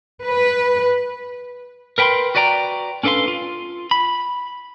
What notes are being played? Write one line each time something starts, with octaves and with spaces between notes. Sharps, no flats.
B4
A#4 B4 G5 A5 B5 C6
F#4 B4 D5 G5 A#5
C#4 D4 A4 B4 F5 C6
F4
B5